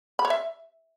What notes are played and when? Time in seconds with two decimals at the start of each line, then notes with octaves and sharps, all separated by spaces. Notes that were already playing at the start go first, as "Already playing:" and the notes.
0.19 B5
0.25 C#5
0.30 E5